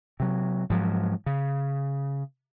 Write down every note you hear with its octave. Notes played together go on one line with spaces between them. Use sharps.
C3 F#3
G#2 F3 F#3
C#3